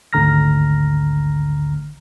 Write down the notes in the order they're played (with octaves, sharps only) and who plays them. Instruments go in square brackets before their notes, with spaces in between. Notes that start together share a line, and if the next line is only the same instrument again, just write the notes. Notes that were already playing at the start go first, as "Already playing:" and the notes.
[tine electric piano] G#1 D2 D3 A#5 F6 A#6